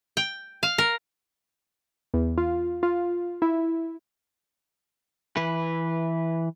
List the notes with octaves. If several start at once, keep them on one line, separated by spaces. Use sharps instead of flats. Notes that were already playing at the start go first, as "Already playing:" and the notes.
G5
F5
A#4
E2
F4
F4
E4
E3 B4